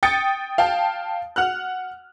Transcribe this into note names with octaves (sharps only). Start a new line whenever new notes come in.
G5 D#6 A6 C#7
F5 G5 A5
F#5 F6 F#6